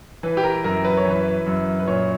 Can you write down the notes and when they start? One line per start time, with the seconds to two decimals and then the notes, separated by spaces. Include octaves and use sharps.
0.23 E3 B4
0.37 G4
0.44 A#4
0.64 F#2 A#4
0.85 B4
0.97 C#5
1.05 E3
1.10 B4
1.46 F#2
1.80 B4
1.87 A#2 C#5